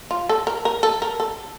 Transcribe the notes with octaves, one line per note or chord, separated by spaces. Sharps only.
F4
A4
A#4
A#4
A4
A#4
A4